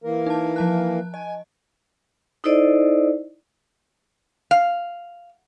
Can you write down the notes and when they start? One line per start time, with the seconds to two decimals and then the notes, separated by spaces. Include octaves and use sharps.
0.04 E3 A#3 A#4
0.26 D#4 A5
0.56 F3 A5 F#6
1.14 D#5 G#5
2.44 D#4 E4 A4 C5 D5 D#5
4.51 F5